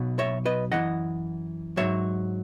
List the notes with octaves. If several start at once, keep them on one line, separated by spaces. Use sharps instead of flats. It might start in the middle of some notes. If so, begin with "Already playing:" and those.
Already playing: B1 B2 F#3
C#5 E5
B4 D#5
F#2 C#3 E3 D#5 F#5
G#2 D#3 F#3 C#5 E5